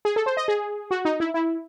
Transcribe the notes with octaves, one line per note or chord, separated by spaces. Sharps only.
G#4
A4
C5
D#5
G#4
F#4
D#4
E4
E4